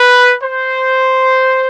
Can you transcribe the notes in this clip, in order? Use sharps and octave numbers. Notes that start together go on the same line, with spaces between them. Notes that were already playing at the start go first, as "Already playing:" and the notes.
Already playing: B4
C5